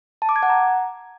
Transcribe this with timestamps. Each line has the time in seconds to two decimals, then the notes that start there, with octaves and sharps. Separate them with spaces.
0.22 A5
0.29 D6
0.36 G#6
0.43 F#5
0.50 A#5